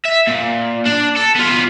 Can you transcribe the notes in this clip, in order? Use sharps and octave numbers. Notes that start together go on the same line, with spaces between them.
E5
A#2
D4
A4
B3 F4